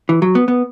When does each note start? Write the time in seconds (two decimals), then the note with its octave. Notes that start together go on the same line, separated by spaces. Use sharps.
0.09 E3
0.22 F#3
0.35 B3
0.48 B3